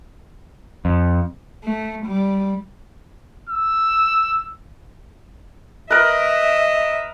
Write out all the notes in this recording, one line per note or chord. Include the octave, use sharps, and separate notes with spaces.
F2
A3
G3
E6
A#4 B4 D#5 E5